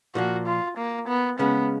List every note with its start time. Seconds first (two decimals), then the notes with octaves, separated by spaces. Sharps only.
0.15 A#2 F3 A#3 F#4
0.47 F4
0.77 A#3
1.08 B3
1.39 C#3 G#3 B3 C#4